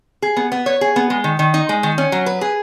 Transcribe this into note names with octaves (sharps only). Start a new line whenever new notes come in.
G#4
B3
B3
C#5
G#4
B3
G#3
D#3
D#3
D#4
G#3
D#3
C#4
F#3
B4
G#4